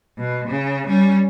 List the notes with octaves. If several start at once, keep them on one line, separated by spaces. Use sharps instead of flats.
B2
C#3
G3 C#4